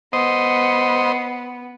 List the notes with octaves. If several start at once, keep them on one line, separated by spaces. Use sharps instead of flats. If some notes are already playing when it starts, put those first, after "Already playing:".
B3 C5 D#5